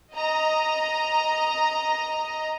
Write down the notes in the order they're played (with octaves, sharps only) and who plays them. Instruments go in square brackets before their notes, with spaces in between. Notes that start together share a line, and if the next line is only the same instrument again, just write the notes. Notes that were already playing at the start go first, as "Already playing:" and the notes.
[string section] D#5 A#5